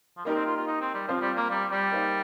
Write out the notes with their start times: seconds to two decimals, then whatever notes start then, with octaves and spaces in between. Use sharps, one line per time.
0.17 F3
0.25 G3 A#3 D#4 G4 A#4
0.35 C4
0.46 F4
0.56 F4
0.67 D#4
0.81 C4
0.94 G3
1.08 F3 C4 F4 C5 F5
1.21 G3
1.36 A#3
1.50 G3
1.71 G3
1.91 A#3 D#4 C5 F5